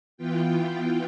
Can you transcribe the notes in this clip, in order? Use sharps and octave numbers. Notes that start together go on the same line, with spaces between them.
E3 B3 F4 G5